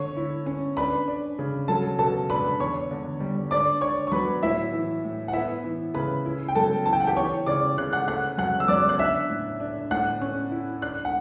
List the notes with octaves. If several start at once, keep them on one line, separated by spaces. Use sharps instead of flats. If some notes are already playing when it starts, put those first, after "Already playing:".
Already playing: D3 C#5 C#6
E4
C#4
D4 B4 B5
D4
C#3
F#3 A4 A5
B2 A4 A5
D4 B4 B5
E2 C#5 C#6
D3
G3
D4 D5 D6
D4 C#5 C#6
C#6
F#3 B4 B5
A2 E4 E5
E3
A2
F#5
B3 E4 E5
E3
C#3 B4 B5
E4
G5
F#2 A4 A5
E3 A5
G5
F#5
G4 G5
E3 C#5 C#6
C#3 D5 D6
C#3 F#6
F#5 F#6
A3 F#5 F#6
F#2 F#5 F#6
E6
F#2 D5 D6
F#6
D4 E5 E6
A2
D4
A2 F#5 F#6
C#4
E4
D4 F#6
F#5